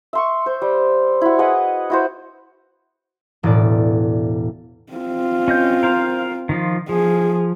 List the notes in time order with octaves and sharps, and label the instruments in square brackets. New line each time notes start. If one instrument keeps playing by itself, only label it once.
[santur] E5 C6 C#6
C5
G3
E4 F#4
G#4 B4 D#5 F#5
E4 F#4 C5
[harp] E1 A2 D5
[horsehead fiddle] C4 F4
[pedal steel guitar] C#4 D#5 G6
A#4 C5 F5
D#3 F3 F4
[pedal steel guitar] F3 [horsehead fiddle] G#4